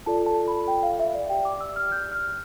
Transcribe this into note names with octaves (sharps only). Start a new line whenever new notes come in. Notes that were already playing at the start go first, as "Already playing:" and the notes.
F4 A4 D5 A5
A5
B5
G5
F5
E5
D5
G4 D5 G5
D6
E6
F6
G6
F6